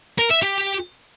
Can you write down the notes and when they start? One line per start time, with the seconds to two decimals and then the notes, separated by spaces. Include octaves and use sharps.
0.18 A#4
0.30 E5
0.42 G4